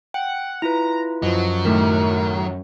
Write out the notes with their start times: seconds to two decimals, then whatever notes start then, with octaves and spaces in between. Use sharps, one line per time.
0.14 F#5 G5
0.62 E4 F4 B4 A#5
1.22 F#2 F3 F#3 D#5
1.65 A2 D#3 A3 A#4